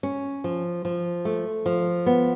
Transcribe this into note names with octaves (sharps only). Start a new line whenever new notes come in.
C#4
F3
F3
A3
F3
B3